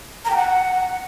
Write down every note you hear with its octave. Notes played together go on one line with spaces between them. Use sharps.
A#5
G5
F#5